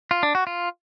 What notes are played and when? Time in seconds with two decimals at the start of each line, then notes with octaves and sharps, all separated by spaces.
0.11 F4
0.23 D4
0.35 F#4
0.47 F4